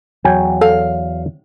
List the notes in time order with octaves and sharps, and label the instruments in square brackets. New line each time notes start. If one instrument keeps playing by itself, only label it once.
[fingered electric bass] E2 [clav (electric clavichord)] F#3 G5 G#5
[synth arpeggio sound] A4 [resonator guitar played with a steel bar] F5